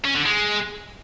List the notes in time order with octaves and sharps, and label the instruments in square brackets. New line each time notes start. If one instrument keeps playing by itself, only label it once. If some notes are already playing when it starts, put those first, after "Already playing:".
[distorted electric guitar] C#4
D3
G#3